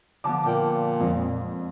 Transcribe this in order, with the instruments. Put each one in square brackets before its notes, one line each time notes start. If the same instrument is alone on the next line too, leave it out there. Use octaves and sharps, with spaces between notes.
[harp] D3 F3 B3 [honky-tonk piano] A5 D6
[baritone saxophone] A#2 [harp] G5
[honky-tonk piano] F2 [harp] G#3